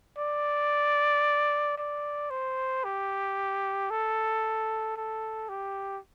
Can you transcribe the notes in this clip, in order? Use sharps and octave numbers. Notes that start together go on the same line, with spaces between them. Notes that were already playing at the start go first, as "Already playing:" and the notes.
D5
D5
C5
G4
A4
A4
G4